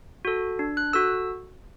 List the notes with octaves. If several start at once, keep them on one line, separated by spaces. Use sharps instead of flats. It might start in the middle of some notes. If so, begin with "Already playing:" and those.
F#4 A4
D4
F#6
F#4 A4 E6